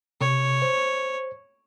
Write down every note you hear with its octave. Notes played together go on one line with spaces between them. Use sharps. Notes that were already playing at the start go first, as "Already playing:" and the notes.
C3 C#5
C5